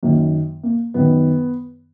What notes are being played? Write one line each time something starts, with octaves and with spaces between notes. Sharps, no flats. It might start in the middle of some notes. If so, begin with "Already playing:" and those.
F#2 D#3 A#3
A#3
F#2 D#3 B3